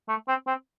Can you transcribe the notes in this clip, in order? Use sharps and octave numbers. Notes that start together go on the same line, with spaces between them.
A3
C4
C4